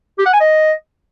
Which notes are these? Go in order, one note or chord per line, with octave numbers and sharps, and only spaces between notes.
G4
F#5
G#5
D#5